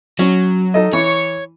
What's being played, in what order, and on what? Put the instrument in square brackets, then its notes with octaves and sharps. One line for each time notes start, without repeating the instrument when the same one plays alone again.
[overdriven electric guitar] F#3 [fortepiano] C#4
[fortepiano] D#4 A4 D#5
[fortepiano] E3 [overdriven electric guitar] C#5